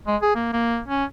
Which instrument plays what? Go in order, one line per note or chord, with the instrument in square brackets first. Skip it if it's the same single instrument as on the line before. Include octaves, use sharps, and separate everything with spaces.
[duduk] G#3
G#4
A#3
A#3
C#4